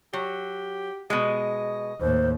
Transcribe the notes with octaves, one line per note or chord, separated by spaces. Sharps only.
F#3 G4
B2 G#3 D#5
D#2 A2 C5